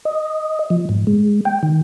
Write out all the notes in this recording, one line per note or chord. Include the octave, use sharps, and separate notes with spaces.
D#5
F3
G#2
G#3
G5
D#3